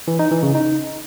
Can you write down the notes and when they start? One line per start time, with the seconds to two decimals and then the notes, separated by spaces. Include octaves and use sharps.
0.08 E3
0.19 D#4
0.31 E3
0.43 C#3
0.55 D#4